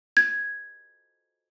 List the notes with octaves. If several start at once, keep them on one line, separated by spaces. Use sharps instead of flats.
G#6